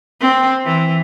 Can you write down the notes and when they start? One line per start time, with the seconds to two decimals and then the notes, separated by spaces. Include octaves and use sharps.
0.20 C4
0.65 E3